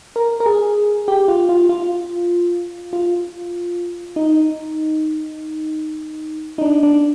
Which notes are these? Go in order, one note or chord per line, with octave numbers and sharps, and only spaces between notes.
A#4
A#4
G#4
G4
F4
F4
F4
F4
D#4
D#4
D4
D4